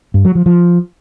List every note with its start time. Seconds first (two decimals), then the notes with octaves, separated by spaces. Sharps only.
0.14 G2
0.25 F#3
0.35 F3
0.46 F3